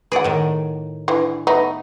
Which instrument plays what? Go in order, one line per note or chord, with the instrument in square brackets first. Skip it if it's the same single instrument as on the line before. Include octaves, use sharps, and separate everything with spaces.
[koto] G#4 D5 [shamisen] B4 F#5
[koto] A2 D#3
[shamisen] D3 E3
A3 B3 D#4